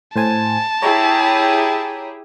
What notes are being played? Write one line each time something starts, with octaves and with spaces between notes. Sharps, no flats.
A2 C5 G#5 A5
E4 G4 G#4 C#5 A#5